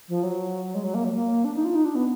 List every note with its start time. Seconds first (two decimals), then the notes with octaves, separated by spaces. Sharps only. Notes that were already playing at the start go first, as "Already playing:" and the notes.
0.08 F3
0.23 F#3
0.74 G#3
0.83 F#3
0.94 A#3
1.04 F#3
1.14 A#3
1.44 D4
1.55 D#4
1.64 F4
1.75 D#4
1.85 D4
1.95 B3